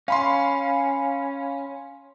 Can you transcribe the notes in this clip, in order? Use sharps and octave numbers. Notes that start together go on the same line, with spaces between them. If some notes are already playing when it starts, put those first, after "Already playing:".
C#4 F5 B5 C6